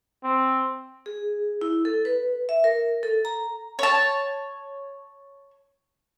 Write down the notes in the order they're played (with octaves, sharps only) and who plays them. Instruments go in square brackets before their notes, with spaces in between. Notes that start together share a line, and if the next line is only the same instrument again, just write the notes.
[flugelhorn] C4
[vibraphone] G#4
E4
A4
B4
E5
A#4
A4
A#5
[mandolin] C#5 A5